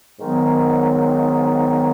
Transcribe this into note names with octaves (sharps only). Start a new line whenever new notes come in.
G#2 D#3 F#3 B3